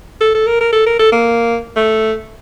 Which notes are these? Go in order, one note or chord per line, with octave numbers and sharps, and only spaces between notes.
A4
A4
A#4
A#4
A4
A#4
A4
A#3
A3